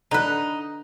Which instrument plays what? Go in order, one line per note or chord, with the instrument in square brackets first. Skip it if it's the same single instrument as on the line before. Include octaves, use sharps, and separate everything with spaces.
[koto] D3 B4 [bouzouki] D#4